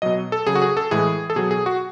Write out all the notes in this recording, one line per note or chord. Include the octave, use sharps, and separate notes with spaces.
B2 F#3 D#5
A4
C#3 F#3 G#4
F#4
G#4
A4
A2 E3 G#3 G#4
A4
B2 F#3 G#4
G#4
F#4